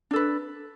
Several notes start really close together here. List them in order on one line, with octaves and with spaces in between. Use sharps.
D4 A4 B4